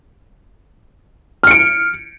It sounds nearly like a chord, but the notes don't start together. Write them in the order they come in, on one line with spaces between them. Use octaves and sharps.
F6 C#7 D7